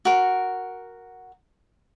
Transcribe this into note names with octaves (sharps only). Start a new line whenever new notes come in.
F#4 A#4